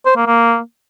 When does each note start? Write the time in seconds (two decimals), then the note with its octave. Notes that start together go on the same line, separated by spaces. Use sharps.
0.05 C5
0.16 A#3
0.27 A#3